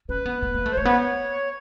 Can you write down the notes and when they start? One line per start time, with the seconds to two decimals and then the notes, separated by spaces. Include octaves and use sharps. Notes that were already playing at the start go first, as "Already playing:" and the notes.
0.09 C#4 B4
0.26 B3
0.43 B3
0.54 A#3
0.66 A3
0.72 C5
0.77 A3 C#5
0.85 B3